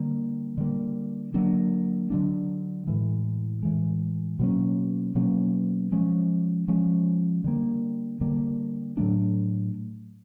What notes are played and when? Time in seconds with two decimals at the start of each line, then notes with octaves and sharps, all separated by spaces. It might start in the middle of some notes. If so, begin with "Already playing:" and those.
Already playing: D3 G3 A#3
0.58 D3 G3 A#3
1.34 D3 F#3 A#3 D4
2.10 D3 F#3 A#3 D4
2.87 A2 E3 G#3
3.63 A2 E3 G#3
4.39 B2 F#3 A#3 C#4
5.15 B2 F#3 A#3 C#4
5.92 F3 G#3 C#4
6.68 F3 G#3 C#4
7.44 D3 G3 A#3
8.21 D3 G3 A#3
8.97 A2 F#3 A3 D4